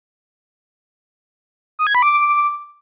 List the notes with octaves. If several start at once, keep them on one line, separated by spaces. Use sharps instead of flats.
D#6
G#6
B5
D6